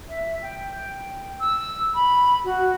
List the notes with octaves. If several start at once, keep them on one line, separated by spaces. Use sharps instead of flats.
E5
G5
E6
B5
F#4